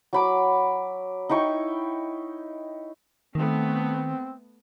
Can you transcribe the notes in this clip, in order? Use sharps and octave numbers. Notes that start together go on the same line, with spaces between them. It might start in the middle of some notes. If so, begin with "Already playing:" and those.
F#3 B5 D6
D#4 E4 G5 C#6
D#3 A3 B3 C4